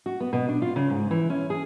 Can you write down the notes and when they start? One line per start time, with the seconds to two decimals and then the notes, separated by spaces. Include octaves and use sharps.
0.06 F#4
0.20 B3
0.33 B2
0.49 D4
0.62 F4
0.76 C#3
0.90 G#2
1.11 E3
1.30 C#4
1.50 G#4